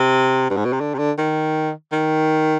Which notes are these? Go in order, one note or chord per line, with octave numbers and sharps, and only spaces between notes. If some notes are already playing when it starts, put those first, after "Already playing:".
Already playing: C3
G2
G#2
B2
C3
D3
C3
D3
D#3
D#3